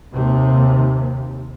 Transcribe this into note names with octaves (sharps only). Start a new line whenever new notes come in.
D#2 C3